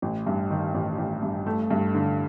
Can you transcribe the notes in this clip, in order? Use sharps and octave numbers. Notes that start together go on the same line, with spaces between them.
A1
G2
D#3
A1
A1
G2
A3
G2
D3